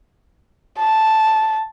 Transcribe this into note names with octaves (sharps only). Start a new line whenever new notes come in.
A5